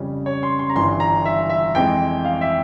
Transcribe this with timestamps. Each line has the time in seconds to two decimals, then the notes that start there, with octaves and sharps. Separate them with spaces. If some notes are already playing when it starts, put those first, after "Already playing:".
Already playing: F2 C#3 G3 C#4
0.26 C#5
0.43 C6
0.59 C6
0.70 A#5
0.75 G1 G2 E3 G3 C6
1.00 A#5
1.25 E5
1.49 E5
1.75 F2 E3 G#3 C4 G5
2.25 F5
2.41 E5